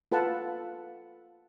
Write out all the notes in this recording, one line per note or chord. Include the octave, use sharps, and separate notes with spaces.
F4 A4 B4 F#5 A5